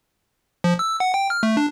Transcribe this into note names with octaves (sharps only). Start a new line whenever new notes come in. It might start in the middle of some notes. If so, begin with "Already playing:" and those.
F3
E6
F#5
G5
F6
A3
D4